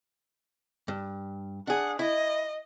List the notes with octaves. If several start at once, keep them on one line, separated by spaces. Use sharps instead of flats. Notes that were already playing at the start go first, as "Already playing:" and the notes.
G2
D4 G#4 F#5
E4 D#5